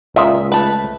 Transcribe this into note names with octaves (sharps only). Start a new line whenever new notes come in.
C#2 A#2 F4 D#5 E5
A3 B4